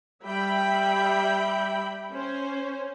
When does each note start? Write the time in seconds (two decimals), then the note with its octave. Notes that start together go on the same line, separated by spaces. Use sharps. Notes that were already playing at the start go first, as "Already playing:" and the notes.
0.25 G3 E5 G5 B5
2.11 C#4 C5